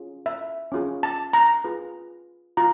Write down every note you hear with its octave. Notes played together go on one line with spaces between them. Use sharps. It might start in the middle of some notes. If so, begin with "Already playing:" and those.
Already playing: C#4 F4 G#4
E5
C#4 F4 G#4
A5
A#5
F4 G#4 B4
F4 A#5